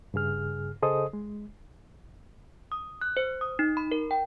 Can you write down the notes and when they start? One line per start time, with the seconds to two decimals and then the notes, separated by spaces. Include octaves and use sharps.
0.14 G2 C#3 G#4 F6
0.82 C#3 G#4 A4 C5 D#5 D#6
1.13 G#3
2.72 D#6
3.01 F#6
3.17 C5
3.41 D#6
3.59 D#4
3.77 B5
3.92 A#4
4.11 G5